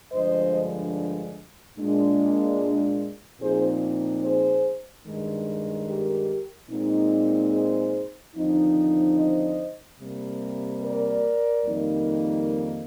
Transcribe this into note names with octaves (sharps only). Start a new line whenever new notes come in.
G2 D3 F3 G#3 C5 D#5
A#2 G#3 D4
A#2 F3 C4 D#4 G#4 C5
G#4 C5
G2 D#3 G#3
G4 A#4
A#2 G#3 C4 D#4
G#4 C5
D#2 D3 F3 C4 D#4
C5 D#5
C3 G3 A#3
A#4 D5
F2 D#3 G3 A#3 D#4